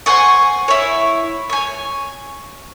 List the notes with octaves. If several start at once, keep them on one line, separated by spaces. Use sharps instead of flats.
C5 F#5 G#5 C#6
E4 C#5
C#5 G#5